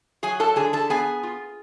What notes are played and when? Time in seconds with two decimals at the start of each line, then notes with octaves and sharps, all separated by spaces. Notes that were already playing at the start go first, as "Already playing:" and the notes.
0.23 F#3 G#4 G#5
0.40 A4 A5
0.56 D3 G#4 G#5
0.73 A4 A5
0.90 B3 G#4 G#5
1.23 F4